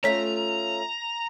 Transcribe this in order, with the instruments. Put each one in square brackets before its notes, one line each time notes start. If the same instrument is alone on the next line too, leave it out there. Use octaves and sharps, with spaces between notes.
[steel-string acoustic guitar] A3 C#4 F4 [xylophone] C#5 B6 [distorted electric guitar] A#5